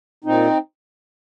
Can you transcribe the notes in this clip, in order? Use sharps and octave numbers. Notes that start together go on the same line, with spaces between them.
A#2 C4 D#4